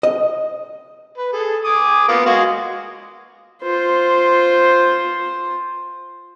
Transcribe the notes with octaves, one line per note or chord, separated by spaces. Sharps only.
D#5
B4
G#4 A4
G#5 D6 D#6
A#3 B3 F4
G#3 F#4 F5
F4 C5